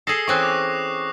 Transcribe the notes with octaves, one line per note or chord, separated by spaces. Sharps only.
G#4 A4 D#6 A#6 C7
E3 C4 C#4 C#6 F#6
D6